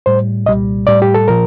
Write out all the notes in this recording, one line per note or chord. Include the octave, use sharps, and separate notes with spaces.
A2 G3 C5
C2 A#2 G3 D#5
A2 G3 D5
G4
A4
A#2 F3 A#4